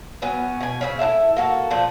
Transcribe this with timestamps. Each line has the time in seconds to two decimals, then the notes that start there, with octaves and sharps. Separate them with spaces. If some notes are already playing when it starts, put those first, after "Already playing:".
0.22 F#3 B3 C#4
0.60 B2 G#5
0.81 C#3 C4 C#4
0.99 E4 F#4 A4 E5
1.36 A#3 F#4 A4
1.71 A#2 F3 D4